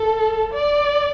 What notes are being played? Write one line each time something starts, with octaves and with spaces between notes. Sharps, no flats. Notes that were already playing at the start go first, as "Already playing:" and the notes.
Already playing: A4
D5